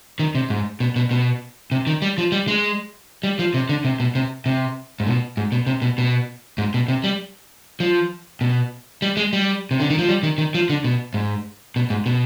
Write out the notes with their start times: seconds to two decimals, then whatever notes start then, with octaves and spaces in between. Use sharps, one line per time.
0.19 D#3
0.35 C3
0.50 G#2
0.80 B2
0.96 B2
1.11 B2
1.72 C3
1.87 D#3
2.02 G3
2.18 F3
2.32 G3
2.48 G#3
3.23 G3
3.39 F3
3.54 C3
3.69 D3
3.85 C3
4.00 B2
4.15 C3
4.46 C3
5.00 G#2
5.07 B2
5.37 G#2
5.52 B2
5.67 C3
5.82 B2
5.98 B2
6.58 G#2
6.74 B2
6.88 C3
7.04 G3
7.80 F3
8.41 B2
9.02 G3
9.17 G#3
9.33 G3
9.71 C3
9.80 D3
9.90 D#3
9.99 F3
10.08 G3
10.23 D#3
10.38 D#3
10.55 F3
10.70 D3
10.84 B2
11.14 G#2
11.76 B2
11.90 G#2
12.06 B2